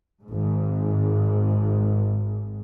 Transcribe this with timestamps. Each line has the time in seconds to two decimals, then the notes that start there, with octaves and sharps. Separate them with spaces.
0.24 G#1 G#2